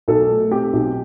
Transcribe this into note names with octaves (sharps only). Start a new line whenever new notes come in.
B1 A4
A3
C4 G4
B1